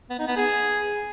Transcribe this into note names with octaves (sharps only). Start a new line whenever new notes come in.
B3
D#4
B3
G#4